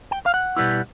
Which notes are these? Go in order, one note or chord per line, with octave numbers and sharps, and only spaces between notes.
G5
F5
F#5
B2 G3 B3 E4